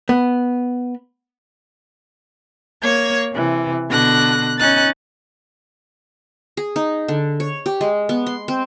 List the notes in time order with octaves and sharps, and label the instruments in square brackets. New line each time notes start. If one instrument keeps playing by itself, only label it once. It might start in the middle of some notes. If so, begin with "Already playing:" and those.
[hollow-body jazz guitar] B3
[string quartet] A#3 C#5 G#6
C3 E3
B2 D3 F#6 A#6
C#4 D#4 F#6 A6
[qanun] G#4
D#4
D3
C#5
G4
G#3
B3
C6
C4